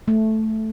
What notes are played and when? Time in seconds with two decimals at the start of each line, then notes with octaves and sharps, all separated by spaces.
0.08 A3